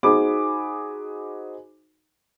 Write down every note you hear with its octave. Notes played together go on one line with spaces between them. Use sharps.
D#4 F#4 G#4 C5 B5 D6